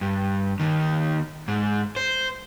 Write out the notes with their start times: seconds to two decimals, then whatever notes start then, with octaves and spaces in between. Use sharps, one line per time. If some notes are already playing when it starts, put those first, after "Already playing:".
0.01 G2
0.60 D#2 D#3
1.48 G#2
1.96 C5